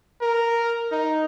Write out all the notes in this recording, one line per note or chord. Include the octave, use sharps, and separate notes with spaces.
A#4
D#4